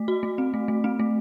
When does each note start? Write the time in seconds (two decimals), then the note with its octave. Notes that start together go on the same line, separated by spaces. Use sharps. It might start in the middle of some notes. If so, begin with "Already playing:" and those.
Already playing: A3
0.08 F#4
0.23 A3
0.38 C4
0.54 A3
0.68 A3
0.84 C4
1.00 A3